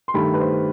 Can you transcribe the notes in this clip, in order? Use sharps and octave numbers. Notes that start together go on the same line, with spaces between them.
C6
G2 D#3 A3 B5
B4
C5